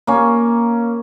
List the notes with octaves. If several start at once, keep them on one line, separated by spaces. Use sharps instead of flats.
A#3 C#4